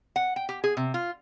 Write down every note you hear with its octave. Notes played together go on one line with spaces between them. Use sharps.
F#5
G5
G4
G#4
C3
F4